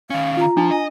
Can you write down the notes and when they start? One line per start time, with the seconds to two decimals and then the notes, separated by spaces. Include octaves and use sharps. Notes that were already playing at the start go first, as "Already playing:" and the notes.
0.10 D#3 C#4 F5
0.37 F4 A#5
0.57 F3 D4 A5
0.71 D#5 G#5